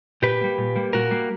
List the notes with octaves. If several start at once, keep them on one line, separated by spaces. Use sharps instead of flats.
A#2 G4 B4
G3 A#3
A#2
G3 A#3
A#2 F#4 A#4
G3 A#3